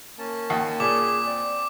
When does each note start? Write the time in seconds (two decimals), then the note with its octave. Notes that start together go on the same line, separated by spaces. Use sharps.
0.18 A#3 C#4 A5
0.50 D#2
0.80 A#2 G#4 D6
1.26 C4 D5